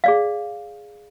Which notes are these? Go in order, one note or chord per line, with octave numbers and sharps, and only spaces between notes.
G#4 D5 F5